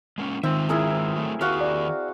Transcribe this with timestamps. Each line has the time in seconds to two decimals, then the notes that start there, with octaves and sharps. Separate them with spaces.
0.18 G#3 A#3 C#4
0.43 D#3 G#3 C4 F4 E5
0.69 E4 G#4 A#4
1.15 F#3 A3 A4
1.41 D#3 F#4 G4 A#4 F5
1.61 D5